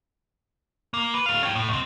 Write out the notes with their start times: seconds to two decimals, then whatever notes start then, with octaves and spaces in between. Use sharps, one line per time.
0.94 A#3
1.14 B4
1.26 A3 F5
1.43 C#4 G5
1.56 A2
1.69 B1 C4